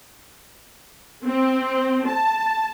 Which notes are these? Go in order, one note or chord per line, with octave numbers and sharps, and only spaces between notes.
C4
A5